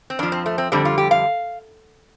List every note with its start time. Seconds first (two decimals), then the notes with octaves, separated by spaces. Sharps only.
0.10 C4
0.19 F2 F3 D4
0.32 C4
0.46 A3
0.58 C4
0.72 F2 D3 G3 C4
0.85 F4
0.98 G4
1.11 F5